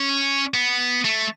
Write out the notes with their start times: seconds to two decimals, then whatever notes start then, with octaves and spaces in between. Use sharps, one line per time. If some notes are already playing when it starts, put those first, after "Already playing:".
Already playing: C#4
0.54 B3
1.05 A3